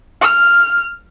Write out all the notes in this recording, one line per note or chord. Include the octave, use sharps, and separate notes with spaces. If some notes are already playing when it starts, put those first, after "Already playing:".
F6